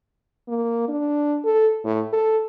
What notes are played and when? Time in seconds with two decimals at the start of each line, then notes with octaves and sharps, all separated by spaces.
0.48 A#3
0.88 D4
1.45 A4
1.85 A2
2.13 A4